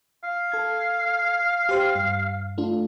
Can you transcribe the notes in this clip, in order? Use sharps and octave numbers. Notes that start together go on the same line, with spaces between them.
F5
A4 G#6
G4 C5
G2
A3 D4 F4